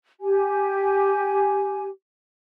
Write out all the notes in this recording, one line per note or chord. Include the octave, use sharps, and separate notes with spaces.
G4 G#5